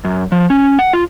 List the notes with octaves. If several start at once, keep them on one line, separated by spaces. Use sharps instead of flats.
F#2
F3
C#4
F#5
F4